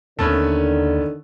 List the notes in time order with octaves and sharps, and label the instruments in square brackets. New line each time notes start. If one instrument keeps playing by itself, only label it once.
[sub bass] D#2 [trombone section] D3 D#3 [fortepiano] A3 B3 C#4